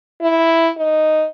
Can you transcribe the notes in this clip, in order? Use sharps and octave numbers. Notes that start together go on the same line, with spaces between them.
E4
D#4